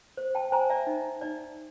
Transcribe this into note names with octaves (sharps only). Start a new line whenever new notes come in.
C5
G5 A5
C5 G#5 A#5
D5 E5
D#4
D#4 D5